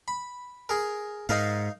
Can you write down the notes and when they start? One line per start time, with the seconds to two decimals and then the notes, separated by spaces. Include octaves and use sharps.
0.08 B5
0.69 G#4 A#4
1.29 G#2 D#4 A#4 F5